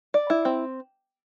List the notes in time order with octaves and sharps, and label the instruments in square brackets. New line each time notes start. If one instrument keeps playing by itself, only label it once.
[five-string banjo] D5
E4
C4